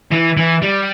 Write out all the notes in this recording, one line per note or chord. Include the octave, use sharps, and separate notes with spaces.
E3
E3
G3